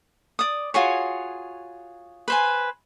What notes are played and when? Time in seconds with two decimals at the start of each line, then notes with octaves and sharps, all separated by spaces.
0.39 D5 D#6
0.74 F4 F#4 G#4 C#5
2.28 B4 C5 G#5